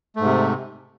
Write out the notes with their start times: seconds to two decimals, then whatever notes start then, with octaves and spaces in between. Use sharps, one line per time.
0.16 A3
0.20 G#2
0.25 C3